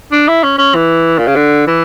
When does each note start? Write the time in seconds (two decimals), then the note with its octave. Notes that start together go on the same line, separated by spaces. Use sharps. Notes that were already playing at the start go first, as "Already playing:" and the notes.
0.12 D4
0.28 E4
0.43 C#4
0.58 C#4
0.75 E3
1.18 A#2
1.27 C#3
1.35 D3
1.67 E3